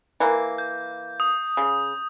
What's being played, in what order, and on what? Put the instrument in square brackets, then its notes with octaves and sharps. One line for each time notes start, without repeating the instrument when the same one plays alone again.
[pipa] E3 A#3
[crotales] G6
D#6
[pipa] C#3